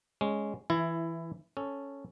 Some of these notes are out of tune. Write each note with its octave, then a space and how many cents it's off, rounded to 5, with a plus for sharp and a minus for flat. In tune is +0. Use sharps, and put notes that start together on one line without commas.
G#3 +0 C#4 +0
E3 +0 E4 +15
C#4 +0 A4 +0